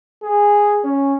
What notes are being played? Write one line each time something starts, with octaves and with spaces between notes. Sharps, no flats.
G#4
C#4